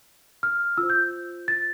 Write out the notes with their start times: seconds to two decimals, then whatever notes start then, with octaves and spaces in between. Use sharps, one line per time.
0.43 F6
0.78 F4 E6
0.83 C5
0.90 G6
1.48 A6